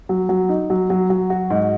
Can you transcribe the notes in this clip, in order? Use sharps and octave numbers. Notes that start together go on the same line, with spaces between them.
F#3
F#3
D#4
F#3
F#3
F#3
F#4
G#2